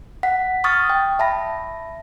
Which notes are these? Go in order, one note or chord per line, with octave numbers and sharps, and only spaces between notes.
F#5 B6
C#6 D#6 F6 A6
G5
E5 A5 B5 A#6